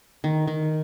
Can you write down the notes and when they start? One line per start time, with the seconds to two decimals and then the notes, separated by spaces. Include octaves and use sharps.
0.24 D#3
0.47 D#3